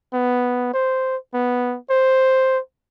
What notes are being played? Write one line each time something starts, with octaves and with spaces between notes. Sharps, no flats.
B3
C5
B3
C5